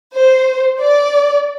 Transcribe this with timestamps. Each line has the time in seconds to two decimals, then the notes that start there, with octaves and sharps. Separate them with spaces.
0.17 C5
0.81 D5